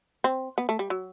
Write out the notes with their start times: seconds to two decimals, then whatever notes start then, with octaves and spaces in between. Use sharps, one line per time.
0.24 C4
0.58 B3
0.69 A3
0.79 G3
0.90 F#3